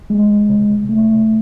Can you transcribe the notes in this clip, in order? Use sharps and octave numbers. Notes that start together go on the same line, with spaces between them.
G#3
C3
A3